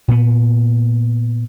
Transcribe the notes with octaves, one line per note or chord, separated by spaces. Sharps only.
A#2 B3